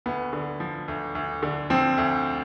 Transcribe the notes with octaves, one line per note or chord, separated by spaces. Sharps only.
D2 B3
D3
F3
D2
D2
D3
F3 C4
D2